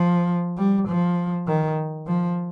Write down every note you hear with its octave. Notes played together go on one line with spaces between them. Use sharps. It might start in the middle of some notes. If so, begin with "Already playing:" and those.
Already playing: F3
G3
F3
D#3
F3